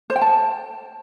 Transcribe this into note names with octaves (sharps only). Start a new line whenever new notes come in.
C5
G5
A5